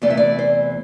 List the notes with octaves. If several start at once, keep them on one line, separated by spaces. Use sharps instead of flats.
E2 C3 E3 A3 D5
E5
D5
C5